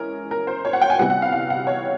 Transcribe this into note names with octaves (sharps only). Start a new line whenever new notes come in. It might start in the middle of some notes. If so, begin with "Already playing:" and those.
Already playing: E3 G#3 C#4 A#4
A#4
C5
C#5
F#5
G5
G#5
C3 E3 G3 B3 F#5
F#5
F5
F5
F#5
C#5